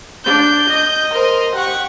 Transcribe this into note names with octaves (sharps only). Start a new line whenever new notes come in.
D4 G6
D#5
A#4 C5
G4 F#5 C#6